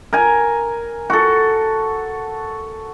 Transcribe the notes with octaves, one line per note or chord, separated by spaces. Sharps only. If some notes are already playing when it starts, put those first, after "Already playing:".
A#4 G#5
F#4 A4